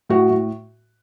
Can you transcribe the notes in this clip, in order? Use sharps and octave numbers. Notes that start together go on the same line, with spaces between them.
A2 F#4
A2